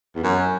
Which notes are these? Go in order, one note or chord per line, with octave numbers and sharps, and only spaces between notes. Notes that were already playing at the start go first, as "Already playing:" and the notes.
E2
F#2